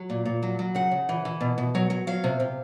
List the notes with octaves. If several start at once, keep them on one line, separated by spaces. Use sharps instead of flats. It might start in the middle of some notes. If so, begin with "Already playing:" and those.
Already playing: F#3
A#2
A#2
F#3
F#3
C#3 F#5
C#3
E3
E3
B2
B2
F#3
F#3
F#3 F5
C3
C3